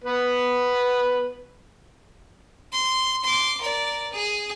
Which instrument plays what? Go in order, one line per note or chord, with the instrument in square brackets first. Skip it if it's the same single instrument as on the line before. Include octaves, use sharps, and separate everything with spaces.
[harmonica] B3 B4
[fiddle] C6
C6 D6
A#4 D5
G#4